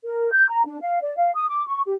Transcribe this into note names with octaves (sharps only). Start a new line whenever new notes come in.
A#4
G6
A#5
D4
F5
D5
F5
D#6
D6
C#6
G4